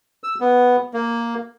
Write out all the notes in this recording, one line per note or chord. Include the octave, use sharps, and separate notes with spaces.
E6
B3
A#3